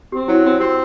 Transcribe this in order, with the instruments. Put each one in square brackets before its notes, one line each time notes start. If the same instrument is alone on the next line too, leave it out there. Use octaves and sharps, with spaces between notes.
[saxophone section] C4 [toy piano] G4
[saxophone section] F#3 [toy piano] E4
[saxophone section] C4 [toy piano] F#4
[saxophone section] C4 [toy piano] G4